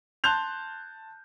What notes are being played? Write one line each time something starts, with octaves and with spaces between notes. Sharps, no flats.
A5 C6 F#6 G6 F7